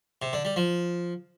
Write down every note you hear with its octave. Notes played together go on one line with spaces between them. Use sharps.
C3
D3
G3
F3